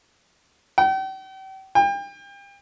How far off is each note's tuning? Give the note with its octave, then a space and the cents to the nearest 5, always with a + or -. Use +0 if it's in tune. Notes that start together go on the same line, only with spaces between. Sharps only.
G5 -40
G5 +35